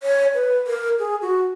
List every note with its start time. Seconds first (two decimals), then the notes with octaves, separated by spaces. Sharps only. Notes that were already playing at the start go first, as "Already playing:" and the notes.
0.03 C#5
0.35 B4
0.67 A#4
0.99 G#4
1.22 F#4